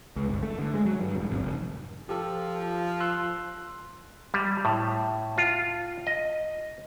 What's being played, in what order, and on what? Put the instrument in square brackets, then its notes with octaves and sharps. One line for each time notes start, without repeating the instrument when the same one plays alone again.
[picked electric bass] C#2
G1
A3
D3
G#3
F#3
G2
E1
G#1
F1
[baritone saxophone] F3 [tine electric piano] G4 A4
[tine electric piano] C6 E6 F#6
[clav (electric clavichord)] G3
A2
F4
D#5